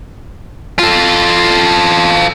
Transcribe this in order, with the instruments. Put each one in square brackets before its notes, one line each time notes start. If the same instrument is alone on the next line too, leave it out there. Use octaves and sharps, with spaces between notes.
[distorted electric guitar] F4 A4